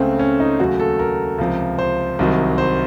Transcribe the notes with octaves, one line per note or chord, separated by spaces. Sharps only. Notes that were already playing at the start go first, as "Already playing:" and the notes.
Already playing: C#2 C#3 A3 C4
C#4
D#4
D#2 C#3 F#3 A3 F#4
A4
A#4
C#2 C3 F3
C5
C2 C3 D#3 F#3
C5